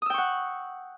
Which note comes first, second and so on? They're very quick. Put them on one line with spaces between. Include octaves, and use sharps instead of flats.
D#6 E6 G5 C#6 F#5